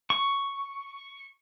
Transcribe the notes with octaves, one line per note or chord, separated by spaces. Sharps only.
C#6